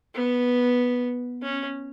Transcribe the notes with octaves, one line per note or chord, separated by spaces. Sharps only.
B3
C#4